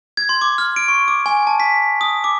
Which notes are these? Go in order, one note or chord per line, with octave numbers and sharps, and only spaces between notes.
G#6
C6
D6
F6
D7
C#6
D6
G#5
A5
B6
D#6
D6